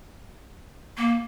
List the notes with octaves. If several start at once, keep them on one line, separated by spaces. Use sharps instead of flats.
A#3